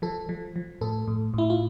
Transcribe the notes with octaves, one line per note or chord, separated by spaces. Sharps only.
F3 A4
F3
F3
A2 A4
A2
A2 E4
F4